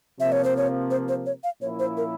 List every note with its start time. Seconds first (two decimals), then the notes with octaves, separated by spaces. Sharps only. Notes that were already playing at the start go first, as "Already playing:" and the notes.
0.19 C3 F3 A#3 E5
0.32 C#5
0.44 C5
0.57 C#5
0.91 C5
1.08 C5
1.26 C#5
1.44 F5
1.61 A#2 F3 A#3 C#4 E4 C#5
1.79 C5
1.97 A#4